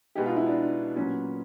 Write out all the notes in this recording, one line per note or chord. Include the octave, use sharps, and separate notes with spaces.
B2 G#3 B3 D#4 G4 G#4
F4
E4
D4
A#2 F#3 B3 C#4